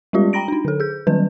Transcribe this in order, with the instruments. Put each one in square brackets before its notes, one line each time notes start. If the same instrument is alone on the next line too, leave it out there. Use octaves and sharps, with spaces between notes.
[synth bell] G3 G#3 C#4 F4 G4 D5
G5 A#5 B5 A#6 D7
D4 D#4
D3 A4
G#4 G6
D#3 F#3 G3 C#4 B4